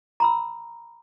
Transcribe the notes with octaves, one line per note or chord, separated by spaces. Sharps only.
A#5 B5 E6